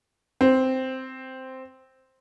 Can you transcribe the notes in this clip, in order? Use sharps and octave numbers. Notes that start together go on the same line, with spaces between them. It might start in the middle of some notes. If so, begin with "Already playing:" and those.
C4